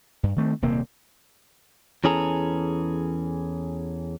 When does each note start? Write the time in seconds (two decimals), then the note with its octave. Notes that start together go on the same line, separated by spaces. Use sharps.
0.23 G2
0.36 D#3 A3 C4
0.62 D#1 C3 A#3 C4
2.04 E2 E3 C#4 G#4 A4 A#5